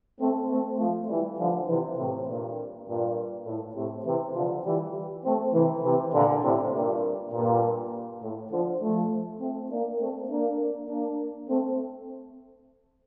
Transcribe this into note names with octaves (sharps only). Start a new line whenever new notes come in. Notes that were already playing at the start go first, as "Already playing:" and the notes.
A3 C4
A3 C4
F3 A3
E3 G3
D3 F3
C3 E3
A2 C3
G2 A#2
G2 A#2
A2
A2 C3
C3 E3
D3 F3
E3 G3
A3 C4
C3 E3
C3 E3
A#2 D3
A2 C3
G2 A#2
G2 A#2
A2
D3 F3
F3 A3
A3 C4
A#3 D4
A3 C4
A#3 D4
A#3 D4
A3 C4